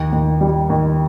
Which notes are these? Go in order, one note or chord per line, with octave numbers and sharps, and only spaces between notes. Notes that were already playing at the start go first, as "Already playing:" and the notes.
Already playing: D#2
D#2
G3
D#2